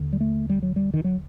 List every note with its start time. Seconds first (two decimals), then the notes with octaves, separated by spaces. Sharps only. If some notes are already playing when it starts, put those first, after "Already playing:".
Already playing: D#2 D3
0.13 G3
0.20 A3
0.50 G3
0.63 F#3
0.76 G3
0.94 D#3
1.04 F#3